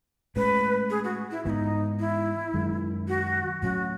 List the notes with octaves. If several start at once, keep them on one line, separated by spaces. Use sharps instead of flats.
A2 G#3 C#4 B4
G#4
F#4
E4
G#2 E3 B3 D#4 E4
E4
F#2 D#3 G#3
F#4
A2 F#3 C#4 F#4